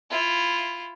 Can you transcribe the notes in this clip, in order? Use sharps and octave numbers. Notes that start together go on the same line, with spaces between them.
E4 F4